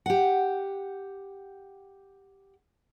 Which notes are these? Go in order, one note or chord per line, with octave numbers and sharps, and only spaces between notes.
G4 F#5